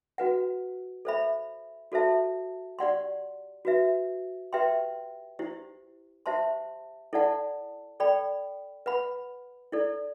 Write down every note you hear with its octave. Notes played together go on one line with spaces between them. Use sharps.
F#4 B4 F#5
A4 C5 E5 B5
F#4 A4 C5 E5 A5
G4 D5 F#5 C6
F#4 B4 E5
G4 B4 E5 G5 C6
E4 G4 C5
G4 C5 E5 A5 C6
E4 A4 D5 F#5 A5
A4 D5 G5 B5
B4 F#5 B5
E4 A4 D5